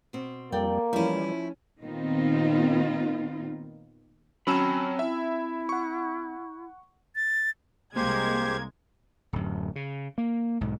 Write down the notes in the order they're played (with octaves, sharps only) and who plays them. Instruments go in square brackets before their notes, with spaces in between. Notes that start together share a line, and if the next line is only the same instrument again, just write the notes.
[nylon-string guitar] B2 C4
[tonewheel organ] F2 G3 [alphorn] A#3 [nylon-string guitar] A4 D5 G5
[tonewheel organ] E3 G3 [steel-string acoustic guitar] F3 E4 [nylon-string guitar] A3 C#4
[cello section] A#2 D#3 B3 C4 D#4 F4
[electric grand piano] F#3 C#4 E6 [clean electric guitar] C4 A5 B5
[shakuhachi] E4 [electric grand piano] E5
[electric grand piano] F#5 C#6
[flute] A6
[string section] C2 G#3 G#6 [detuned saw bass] A#3 [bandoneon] G4 C5
[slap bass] D1 F#2
C#3
A#3
B1 G#2